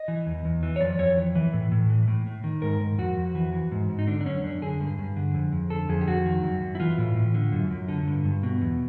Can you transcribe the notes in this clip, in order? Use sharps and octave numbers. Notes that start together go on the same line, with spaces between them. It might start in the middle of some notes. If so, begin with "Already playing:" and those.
Already playing: D#5
E3
E2
E2
E3
C#5
F2 D5
F2 C#5
E3
E3
A2
A2
E3
A2
A2
D#3
G#2 A#4
G#2
F2 F#4
F2
E3
E3
G#2
G#2
D#4
D3 D4
D4
F#2 C#4
F#2 D4
D3 G#4
G2
G2
D3
F2
F2
D3 A4
F2 G#4
G4
F2 F#4
D#3
F#2
F#2
E4
E3 F4
A2
A2
D3
F#2
F#2
D3
G2
G2
B2
E2